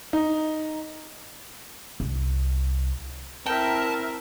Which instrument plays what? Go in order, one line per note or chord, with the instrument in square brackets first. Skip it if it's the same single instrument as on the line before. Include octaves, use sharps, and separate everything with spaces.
[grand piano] D#4
[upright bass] C2
[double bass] C4 E4 [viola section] A#4 E5 [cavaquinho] G5 [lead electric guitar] A5